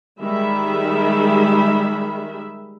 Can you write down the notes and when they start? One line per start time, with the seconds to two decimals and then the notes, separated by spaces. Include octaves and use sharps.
0.21 D#3 G3 G#3 E5 B5